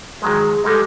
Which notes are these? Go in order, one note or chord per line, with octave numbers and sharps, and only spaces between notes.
D#3 F#3 G#3 G#4
G3 G#3 D#4 G4 A4